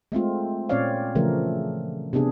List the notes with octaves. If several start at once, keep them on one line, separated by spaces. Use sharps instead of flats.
G#3 A3 C4 F4
A#2 C4 C#4 C#5 D5 F5
C#3 E3 F3 A3 A#4
C3 B3 D4 G#4